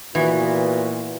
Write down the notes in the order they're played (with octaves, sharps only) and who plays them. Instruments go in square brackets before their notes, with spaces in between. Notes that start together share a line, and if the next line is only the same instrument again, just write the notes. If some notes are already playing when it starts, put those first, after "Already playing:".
[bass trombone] A#2 [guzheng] E3 [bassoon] B3 [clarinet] F#4